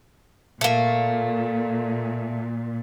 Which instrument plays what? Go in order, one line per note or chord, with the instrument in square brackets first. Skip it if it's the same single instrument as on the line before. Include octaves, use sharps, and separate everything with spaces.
[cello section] A#2 [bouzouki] A3 A#3